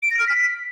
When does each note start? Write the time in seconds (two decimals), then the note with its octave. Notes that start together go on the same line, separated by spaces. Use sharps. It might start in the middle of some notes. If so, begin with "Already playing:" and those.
0.03 D7
0.11 A#6
0.19 F6
0.27 B6